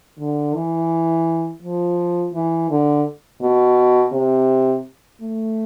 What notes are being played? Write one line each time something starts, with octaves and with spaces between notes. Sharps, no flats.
D3
E3
F3
E3
D3
B2
C3
A3